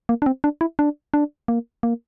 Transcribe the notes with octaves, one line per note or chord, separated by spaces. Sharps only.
A#3
D4
C4
D4
E4
D4
D4
A#3
A#3